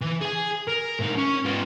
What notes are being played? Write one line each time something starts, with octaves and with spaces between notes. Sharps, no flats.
E3
G#4 G#5
A#4
A2 D#4
C#4
B3 F4